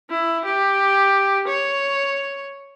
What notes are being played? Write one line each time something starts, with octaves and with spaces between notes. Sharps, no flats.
E4
G4
C#5